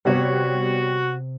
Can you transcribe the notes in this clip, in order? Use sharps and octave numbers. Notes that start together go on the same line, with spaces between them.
C3 G3 B3 F#4 C#5 C6